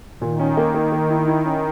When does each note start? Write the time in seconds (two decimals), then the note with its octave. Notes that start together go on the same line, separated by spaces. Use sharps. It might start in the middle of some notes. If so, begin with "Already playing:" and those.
0.21 A#2 D#3
0.40 C#4
0.57 A#3
0.74 A#3
0.92 A#3
1.10 E4
1.28 E4
1.45 C#4